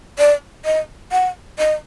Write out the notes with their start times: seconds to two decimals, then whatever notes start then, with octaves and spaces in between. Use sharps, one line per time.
0.19 D5
0.65 D#5
1.12 F#5
1.59 D#5